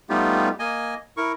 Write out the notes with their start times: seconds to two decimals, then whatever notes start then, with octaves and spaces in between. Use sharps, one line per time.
0.09 G3 A3 B3 D#4 F4 G4
0.59 A#3 D#5 G#5
1.17 E4 A#4 C#6